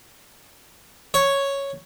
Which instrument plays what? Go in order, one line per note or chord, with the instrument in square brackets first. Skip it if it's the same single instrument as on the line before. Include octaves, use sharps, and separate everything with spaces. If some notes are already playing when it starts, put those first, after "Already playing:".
[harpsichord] C#5